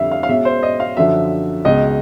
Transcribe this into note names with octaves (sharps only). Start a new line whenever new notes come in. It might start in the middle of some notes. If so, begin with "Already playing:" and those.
Already playing: F2 D3 G3 E5 F5
F5
F5
B2 G#3 C#4 E5
C5
D#5
F5
F#2 D3 F3 E5
C#2 B2 G#3 D#5